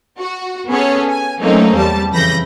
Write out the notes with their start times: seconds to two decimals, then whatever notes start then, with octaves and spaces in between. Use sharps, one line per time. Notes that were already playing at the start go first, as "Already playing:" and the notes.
0.18 F#4
0.68 B3 C#4 G#4 A4 C#5
1.09 G#5
1.41 F#3 A3 A#3 C4 C#4 D#4
1.76 E2 G3 A5
2.12 F2 C#3 E3 B5 G6 A#6